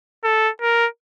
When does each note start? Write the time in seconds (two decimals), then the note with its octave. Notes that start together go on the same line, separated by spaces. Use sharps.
0.24 A4
0.61 A#4